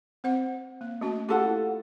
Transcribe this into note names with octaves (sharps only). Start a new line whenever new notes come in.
C4 C5 F#5
A#3
A3 C#4 F#4
E4 F4 G4 A4 F#5